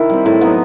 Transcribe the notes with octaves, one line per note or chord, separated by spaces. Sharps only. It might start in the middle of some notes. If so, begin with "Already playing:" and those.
Already playing: D#3 E4
G3 C4
A2 E4
F#3 B3 D#4